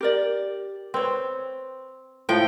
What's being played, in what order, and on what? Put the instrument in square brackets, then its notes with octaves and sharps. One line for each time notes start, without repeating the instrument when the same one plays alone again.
[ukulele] G4 A#4 D5
[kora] C4 [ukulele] B4 C#5
[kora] A2 F3 G5